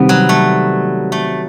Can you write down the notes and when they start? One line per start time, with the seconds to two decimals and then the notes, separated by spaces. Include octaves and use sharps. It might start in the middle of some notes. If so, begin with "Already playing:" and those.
Already playing: C3 D#3 G3 B3 C4
0.09 F#3
0.29 A3
1.12 A3